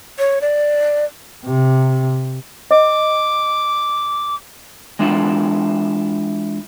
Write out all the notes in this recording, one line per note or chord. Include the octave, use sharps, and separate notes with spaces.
C#5
D5
C3
D#5 D6
E3 G#3 D4 E4 F4 E5